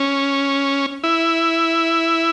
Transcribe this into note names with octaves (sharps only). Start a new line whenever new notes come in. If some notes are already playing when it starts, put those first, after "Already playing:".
Already playing: C#4
E4